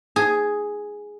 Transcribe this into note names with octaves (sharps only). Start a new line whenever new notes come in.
G#4